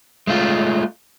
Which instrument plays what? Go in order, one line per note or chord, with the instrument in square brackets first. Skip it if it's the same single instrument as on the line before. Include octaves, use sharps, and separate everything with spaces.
[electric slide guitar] G#3 A3 E4 F4